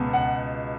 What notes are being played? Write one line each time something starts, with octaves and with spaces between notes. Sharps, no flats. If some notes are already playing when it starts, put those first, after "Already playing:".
Already playing: C#2 B2 B3
F#5